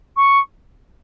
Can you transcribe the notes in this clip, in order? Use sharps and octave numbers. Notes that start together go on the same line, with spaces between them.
C#6